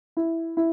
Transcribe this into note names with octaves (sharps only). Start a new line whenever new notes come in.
E4
E4